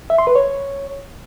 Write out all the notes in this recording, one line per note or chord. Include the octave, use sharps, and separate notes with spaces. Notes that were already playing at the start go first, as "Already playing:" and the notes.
E5
C6
B4
C#5